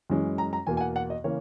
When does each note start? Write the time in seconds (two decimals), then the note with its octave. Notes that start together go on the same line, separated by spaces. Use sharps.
0.10 F#2 E3 G#3 C#4
0.38 A#5
0.53 A#5
0.67 E2 B2 A#3 G#5
0.77 G#5
0.81 F#5
0.96 F#5
1.10 D#5
1.24 C#3 E3 A#3 C#4 C#5